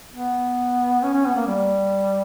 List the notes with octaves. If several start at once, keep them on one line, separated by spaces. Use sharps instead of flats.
B3
C#4
C#4
B3
A#3
G3